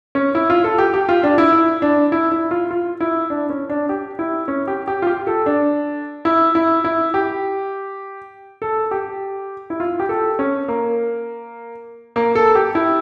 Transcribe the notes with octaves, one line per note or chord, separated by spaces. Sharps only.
C#4
E4
F4
A4
G4
G4
F4
D4
E4
E4
D4
E4
E4
F4
F4
E4
D4
C#4
D4
G4
E4
C#4
G4
G4
F4
G4
A4
D4
E4
E4
E4
G4
A4
G4
E4
F4
G4
A4
C#4
A#3
A#3
A4
G4
E4